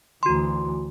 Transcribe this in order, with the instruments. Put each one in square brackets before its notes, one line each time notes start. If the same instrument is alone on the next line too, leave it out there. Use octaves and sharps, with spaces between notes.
[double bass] D2 E3 [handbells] F#4 C6